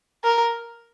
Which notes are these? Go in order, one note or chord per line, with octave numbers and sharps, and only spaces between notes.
A#4